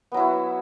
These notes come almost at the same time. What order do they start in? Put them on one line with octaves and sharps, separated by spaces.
B3 F#3 E4 F#4